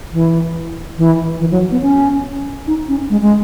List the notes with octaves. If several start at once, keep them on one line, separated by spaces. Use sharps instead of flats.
E3
E3
E3
F#3
B3
C#4
D#4
C#4
G#3
G#3